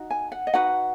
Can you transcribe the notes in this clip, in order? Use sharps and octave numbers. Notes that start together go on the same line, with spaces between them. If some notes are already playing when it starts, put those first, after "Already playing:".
Already playing: D#4 F#4
G#5
F#5
D#5
D#4 F#4 B4 F#5